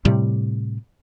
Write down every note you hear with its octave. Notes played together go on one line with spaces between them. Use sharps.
A2 C3 G3